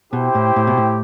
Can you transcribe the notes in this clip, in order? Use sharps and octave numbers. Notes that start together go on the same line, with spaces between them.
B2 E4 G4 C5 G5
A2
A2
B2
A2